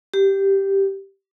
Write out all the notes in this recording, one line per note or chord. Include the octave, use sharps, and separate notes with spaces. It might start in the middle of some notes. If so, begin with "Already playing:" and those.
G4